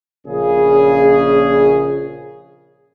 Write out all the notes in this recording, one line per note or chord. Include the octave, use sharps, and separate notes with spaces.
A#1 C#3 G#4